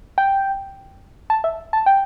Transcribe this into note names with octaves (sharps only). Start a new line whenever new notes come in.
G5
A5
E5
A5
G5